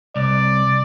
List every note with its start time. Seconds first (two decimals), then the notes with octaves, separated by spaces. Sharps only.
0.16 C2 D5